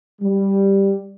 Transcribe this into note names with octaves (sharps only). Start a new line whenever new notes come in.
G3